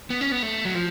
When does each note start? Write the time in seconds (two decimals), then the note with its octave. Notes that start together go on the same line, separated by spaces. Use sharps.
0.10 B3
0.21 C#4
0.32 B3
0.43 A3
0.65 F#3
0.75 F3